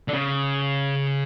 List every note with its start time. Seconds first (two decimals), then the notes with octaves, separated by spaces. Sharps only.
0.08 D3
0.13 C#3